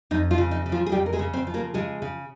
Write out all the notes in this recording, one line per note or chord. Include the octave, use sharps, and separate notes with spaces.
F2 D#4
F3 F4
C#3
D#4
C#3
F3 F4
G#4
F2 G3 G4
A#4
G#3 G#4
C#3
C4 C5
F3
A#3 A#4
C#3 G#3 G#4
C#3